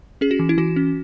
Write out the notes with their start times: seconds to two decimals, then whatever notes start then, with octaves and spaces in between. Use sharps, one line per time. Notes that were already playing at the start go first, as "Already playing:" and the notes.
0.21 C#4 G#4
0.31 F#4
0.39 E3
0.49 E4
0.58 E3 F#4
0.76 C#4